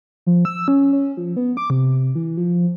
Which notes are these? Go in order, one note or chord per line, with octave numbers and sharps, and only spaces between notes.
F3
E6
C#4
C#4
F3
B3
D6
C3
E3
F3